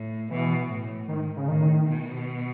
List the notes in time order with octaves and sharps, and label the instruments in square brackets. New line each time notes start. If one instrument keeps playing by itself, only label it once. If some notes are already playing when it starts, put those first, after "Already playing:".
Already playing: [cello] A2
[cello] B2 [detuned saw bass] E3
[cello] A2
[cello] G#2 [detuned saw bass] D#3
[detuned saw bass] C#3
[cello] A2 [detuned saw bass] D#3
[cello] B2